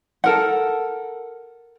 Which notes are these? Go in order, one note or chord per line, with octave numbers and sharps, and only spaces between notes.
A4 A#4 F#5